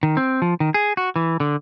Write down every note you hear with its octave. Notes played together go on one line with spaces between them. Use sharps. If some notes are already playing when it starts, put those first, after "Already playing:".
D#3
C4
F3
D#3
G#4
F#4
E3
D3